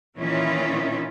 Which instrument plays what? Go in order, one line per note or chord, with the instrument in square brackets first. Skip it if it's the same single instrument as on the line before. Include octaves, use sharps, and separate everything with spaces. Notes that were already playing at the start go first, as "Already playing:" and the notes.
[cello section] A#2 D#3 E3 C#4 E4 F4